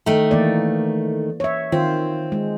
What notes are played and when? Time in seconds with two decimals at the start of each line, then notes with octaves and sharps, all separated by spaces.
0.06 D#3 A3
0.31 E3 A#3 D5
1.40 C#5 E5
1.72 D#3 C4 F4 C5
2.32 G#3